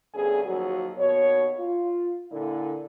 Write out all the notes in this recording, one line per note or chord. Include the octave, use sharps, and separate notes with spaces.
D2 G2 B3 C#4 G#4
D#2 F3 F#3 F#4
D#2 B2 F#4 C#5
F4
A#2 D3 E4